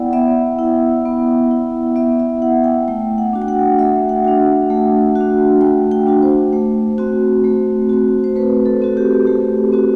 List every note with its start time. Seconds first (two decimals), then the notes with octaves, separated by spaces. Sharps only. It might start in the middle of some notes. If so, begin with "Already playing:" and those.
Already playing: B3 E4 D5 F#5 G5
0.13 B3 E5
0.59 E4
1.05 B3
1.51 E4
1.96 B3 E5
2.20 E5
2.42 E4 F#5
2.64 G5
2.88 A3 G5
3.18 F#5
3.33 D4 F#4
3.42 G5
3.48 F#5
3.79 A3 E5
4.09 F#5
4.24 D4 F#4
4.70 A3
5.16 F#4
5.21 D4
5.61 A3 G5
5.91 G5
6.07 D4 F#4
6.22 C5
6.53 A3
6.98 C4 F#4
7.44 A3
7.89 C4 F#4
8.24 C5
8.35 A3 B4
8.66 A4
8.82 C4 F#4
8.97 G4
9.27 A3 G4
9.72 C4 F#4